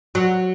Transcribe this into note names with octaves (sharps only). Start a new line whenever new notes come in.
F#3